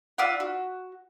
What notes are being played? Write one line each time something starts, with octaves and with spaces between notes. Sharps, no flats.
F4 D5 E5 F#5
F#4